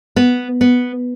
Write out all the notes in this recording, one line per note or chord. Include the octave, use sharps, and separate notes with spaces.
B3
B3